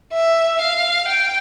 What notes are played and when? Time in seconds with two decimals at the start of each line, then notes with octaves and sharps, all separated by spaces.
0.13 E5
0.61 F5
1.08 G5